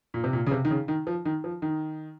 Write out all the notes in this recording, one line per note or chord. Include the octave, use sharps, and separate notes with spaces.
A#2
C3
A#2
C#3
C3
D#3
C#3
D#3
F3
D#3
F3
D#3